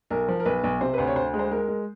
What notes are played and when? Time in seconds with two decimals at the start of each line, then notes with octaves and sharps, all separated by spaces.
0.10 B1 A#4
0.28 F3
0.40 A#4
0.45 B1 B4
0.64 B1
0.81 C3 C5
0.94 B4
0.98 D2 C5
1.07 C#5
1.16 D2 C5
1.34 G#3
1.39 C5
1.51 G#3 A#4
1.68 G#3